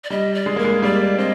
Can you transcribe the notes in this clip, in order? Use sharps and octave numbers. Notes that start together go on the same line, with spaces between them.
D5
G3 D#5
D5
G#3
A#3 A#4
G#3
G3 A#3 D5
C4 D#5